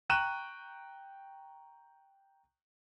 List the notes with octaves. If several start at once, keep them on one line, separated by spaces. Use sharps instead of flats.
G5 A#5 C#6 F#6 D#7 E7